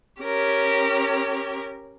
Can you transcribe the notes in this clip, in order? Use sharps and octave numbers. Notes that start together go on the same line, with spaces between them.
C#4 G4 A#4